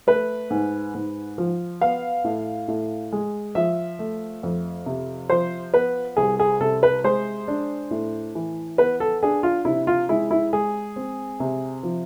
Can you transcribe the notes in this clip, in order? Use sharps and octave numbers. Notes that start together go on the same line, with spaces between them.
A3 B4
G#2
G#2
F3
B3 F5
A2
A2
G#3
F3 E5
A3
F2
C3
F3 C5
B3 B4
C2 G#4
G#4
C3 A4
B4
G#3 C5
D4
A2
E3
B3 B4
A4
D4 G#4
F4
C3 E4
F4
G#3 E4
E4
G#3 G#4
C4
C3
F3